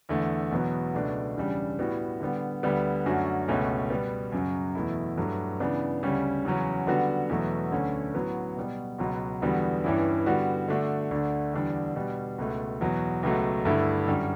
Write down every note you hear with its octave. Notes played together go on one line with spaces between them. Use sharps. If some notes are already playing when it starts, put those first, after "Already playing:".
E2 D3 A3
E2 B2 F#3 B3
C#2 B2 A3 D4
E2 C#3 G3 D4
A2 G3 B3 F#4
D3 G3 B3
D2 D3 G3 B3
F#2 D3 A3 C#4 F#4
C#2 B2 A3 C#4
B2 G3 B3
F#2 C#3 F#3
E2 B2 A3 E4
G2 F#3 A3
C#3 E3 B3 D4
D2 C#3 G3 C#4
E2 C#3 F#3 C#4
D3 G3 B3 F#4
E2 B2 F#3 A3
D2 D3 A3 C#4
A2 F#3 B3 F#4
B2 G3 B3
C#2 B2 F#3 B3
E2 D3 G3 B3 F#4
G2 E3 G3 C#4 E4
D3 G3 B3 F#4
D3 A3 D4 F#4
D2 D3 A3 D4
E2 D3 G3 D4
B2 G3 D4
C#2 B2 A3
E2 B2 F#3
C#2 B2 F#3 A3
G2 D3 A3 E4
F#2 D3 G3